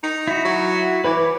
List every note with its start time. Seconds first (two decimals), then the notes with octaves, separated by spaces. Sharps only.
0.03 D#4
0.28 E4 F#4
0.44 F#3
1.04 E3 B4 C#5 D6